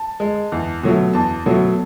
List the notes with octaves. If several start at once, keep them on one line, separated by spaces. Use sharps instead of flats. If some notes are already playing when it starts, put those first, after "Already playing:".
Already playing: A5
G#3
E2
B2 F#3 A3
E2 A5
B2 F#3 A3